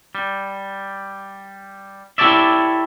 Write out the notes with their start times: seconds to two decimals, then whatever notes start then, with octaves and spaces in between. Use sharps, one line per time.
0.15 G3
2.18 E4 G4 A4 C#5 D5 E5